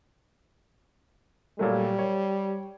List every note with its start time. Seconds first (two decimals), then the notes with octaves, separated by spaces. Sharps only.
1.59 A#2 F#3 G3 A3
1.99 C#5